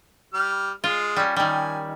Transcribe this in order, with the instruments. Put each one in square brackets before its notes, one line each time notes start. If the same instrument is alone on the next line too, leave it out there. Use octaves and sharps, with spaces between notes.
[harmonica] G3 F6
[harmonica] G#3 [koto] F4
[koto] G3 C#4
[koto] D#3 G3 [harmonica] G#5